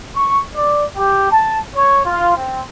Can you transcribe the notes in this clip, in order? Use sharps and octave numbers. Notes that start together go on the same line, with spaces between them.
C#6
D5
G4
A5
C#5
F4
C4